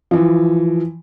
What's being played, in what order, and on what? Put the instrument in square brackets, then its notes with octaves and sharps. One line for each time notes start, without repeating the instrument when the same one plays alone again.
[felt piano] E3 F3